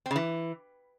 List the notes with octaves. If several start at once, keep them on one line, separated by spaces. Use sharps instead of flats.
C4
C#3
E3